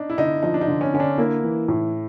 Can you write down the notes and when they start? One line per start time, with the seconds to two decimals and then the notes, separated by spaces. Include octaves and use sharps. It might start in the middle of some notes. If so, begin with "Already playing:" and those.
Already playing: D4 D#4
0.10 E4
0.18 D3 D#4
0.42 F3 D#4
0.54 D4
0.61 D#4
0.68 D3
0.81 C#4
0.94 D3 C#4
1.00 D4
1.18 A#3 E4
1.44 E3
1.68 A2